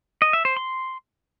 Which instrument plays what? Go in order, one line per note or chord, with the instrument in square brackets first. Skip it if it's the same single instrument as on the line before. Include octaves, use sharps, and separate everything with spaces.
[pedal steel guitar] D#5
E5
C5
C6